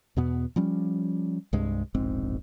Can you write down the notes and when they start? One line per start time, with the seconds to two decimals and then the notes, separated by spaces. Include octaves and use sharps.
0.17 E2 B2 B3
0.56 F3 G3 C#4
1.53 C2 G2 G#3
1.94 E1 A#1 G#2 C4